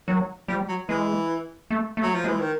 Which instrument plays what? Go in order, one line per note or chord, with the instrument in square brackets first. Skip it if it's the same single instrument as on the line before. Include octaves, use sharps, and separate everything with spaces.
[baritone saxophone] D#3 [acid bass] F#3
[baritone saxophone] F3 [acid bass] G3
[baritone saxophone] F#3
[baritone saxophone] E3 [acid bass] G#3
[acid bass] A3
A3
[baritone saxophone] F#3
F3
[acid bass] G#3
[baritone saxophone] E3
D#3